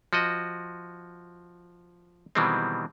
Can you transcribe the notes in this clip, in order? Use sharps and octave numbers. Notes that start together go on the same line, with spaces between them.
F3 F#4 D#5
B2 D#3 E3 G3 G#3 C4